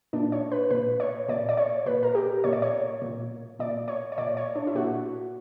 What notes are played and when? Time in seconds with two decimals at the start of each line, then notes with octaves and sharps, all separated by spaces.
0.13 A#2 D4
0.32 C#5
0.52 B4
0.71 A#2 B4
1.00 C#5
1.29 A#2 D5
1.49 D5
1.57 C#5
1.86 A#2 B4
2.03 A#4
2.15 G4
2.44 A#2 C#5
2.53 D5
2.62 C#5
3.02 A#2
3.59 A#2 D5
3.88 C#5
4.12 C#5
4.18 A#2 D5
4.37 C#5
4.56 D4
4.67 E4
4.75 A#2 F#4